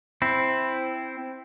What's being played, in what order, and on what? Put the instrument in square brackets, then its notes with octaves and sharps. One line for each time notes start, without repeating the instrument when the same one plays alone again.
[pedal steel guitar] C4 E4